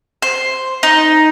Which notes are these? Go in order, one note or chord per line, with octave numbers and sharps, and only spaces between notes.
C5
D#4